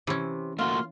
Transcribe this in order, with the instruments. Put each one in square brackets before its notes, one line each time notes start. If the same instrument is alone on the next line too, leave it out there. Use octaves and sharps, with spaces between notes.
[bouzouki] C3 [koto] E3 C#4
[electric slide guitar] A3 A#3 F#4 [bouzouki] F4 [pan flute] C6